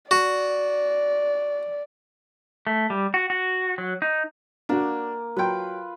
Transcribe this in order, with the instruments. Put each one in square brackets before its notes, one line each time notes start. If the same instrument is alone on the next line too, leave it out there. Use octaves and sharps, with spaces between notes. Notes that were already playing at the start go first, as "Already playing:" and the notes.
[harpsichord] F#4 [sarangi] D5
[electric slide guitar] A3
G3
F#4
F#4
F#3
D#4
[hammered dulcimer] A#3 [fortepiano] D4 F#4
[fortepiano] F#3 G5 [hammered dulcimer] F4 B4